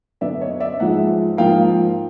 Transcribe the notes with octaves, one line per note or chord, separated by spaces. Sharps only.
F#2 D3 F#3 B3 D5 E5
C#5 D#5
D5 E5
G#2 F3 G#3 E5 F#5
G#2 F3 A#3 F5 G5